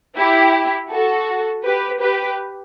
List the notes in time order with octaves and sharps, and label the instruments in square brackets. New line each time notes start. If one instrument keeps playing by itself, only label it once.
[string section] E4 G4
F#4 A4
G4 B4
G4 B4